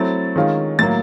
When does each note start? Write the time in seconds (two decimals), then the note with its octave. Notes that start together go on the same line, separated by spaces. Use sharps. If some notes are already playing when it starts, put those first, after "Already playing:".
Already playing: F#3 A3 C4 E4 A6
0.36 D#3 G#3 C#4 F4
0.79 A2 F#3 A#3 A6